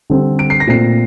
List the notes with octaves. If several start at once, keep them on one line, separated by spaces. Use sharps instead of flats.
D3 G3 C4
D7
C7
A#6
A#2 A3 C4 C7